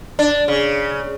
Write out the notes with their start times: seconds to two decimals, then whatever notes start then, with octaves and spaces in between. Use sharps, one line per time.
0.19 D4
0.48 C#3